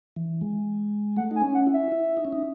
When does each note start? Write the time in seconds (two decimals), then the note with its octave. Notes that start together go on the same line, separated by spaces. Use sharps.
0.16 E3
0.41 G#3
1.17 A3 F#5
1.31 D#4 G#5
1.42 C#4
1.54 F#5
1.67 E4
1.74 E5
1.92 E4
2.17 D#4
2.25 C#4
2.33 D#4